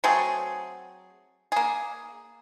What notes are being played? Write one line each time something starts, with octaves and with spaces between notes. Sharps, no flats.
F#3 A3 C4 G#4
A#3 G#4